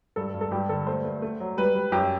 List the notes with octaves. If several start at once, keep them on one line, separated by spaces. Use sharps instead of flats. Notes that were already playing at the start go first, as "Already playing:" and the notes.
G2 A4
G2
A4
G2 G4
D3 A4
A3 C5
A3
A3
F#3
G3 B4
G3
F#2 G4